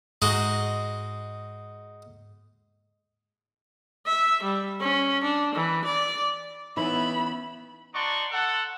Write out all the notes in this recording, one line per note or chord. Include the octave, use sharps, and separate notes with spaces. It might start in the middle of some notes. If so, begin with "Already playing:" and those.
G#2 G#3 D#4 F#4
E5
G3
C#4
D4
E3
D5
E3 B3 C#4 D#4 E4 E5 B5
D#4 F#4 D5 A5 C6 C#6
A4 F#5